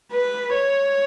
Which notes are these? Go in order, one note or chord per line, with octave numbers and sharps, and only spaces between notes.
B4
C#5